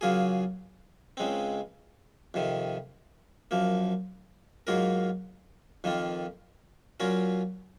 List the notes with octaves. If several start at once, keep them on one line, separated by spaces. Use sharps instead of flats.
C#3 F#3 A#3 F4 G#4
C#2 C#3 G#3 C4
F2 C3 D#3
F#2 F3 A#3
G#2 F#3 A#3 F4 A#4
F2 D#3 A#3 F4
A#2 F#3 C#4 F4 A#4